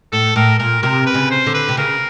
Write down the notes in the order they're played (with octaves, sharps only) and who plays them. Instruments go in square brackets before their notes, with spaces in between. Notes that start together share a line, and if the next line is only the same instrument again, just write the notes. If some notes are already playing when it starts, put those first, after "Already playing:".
[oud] A2 [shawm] A4
[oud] A2 [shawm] A#4
[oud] A#2 [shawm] A#4
[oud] C3 [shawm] A#4
[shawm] B4
[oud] C#3
[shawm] C5
[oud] D3
[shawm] B4
[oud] C3
[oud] C#3 [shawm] A#4